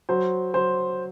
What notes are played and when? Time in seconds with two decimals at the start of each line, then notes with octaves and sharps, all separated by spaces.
0.09 F#3 C5
0.54 F#3 C5